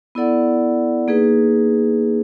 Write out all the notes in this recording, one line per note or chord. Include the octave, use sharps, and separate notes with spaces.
B3 E4 A4 D5 F#5
A#3 D#4 G#4 B4